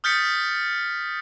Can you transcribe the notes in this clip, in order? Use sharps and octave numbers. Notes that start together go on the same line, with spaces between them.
D#6 F6 G6 A6 B6 C#7